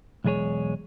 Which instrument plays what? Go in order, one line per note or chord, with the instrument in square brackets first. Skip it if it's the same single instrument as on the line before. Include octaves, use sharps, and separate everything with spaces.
[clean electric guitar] B1 E2 G#3 G#4 C#5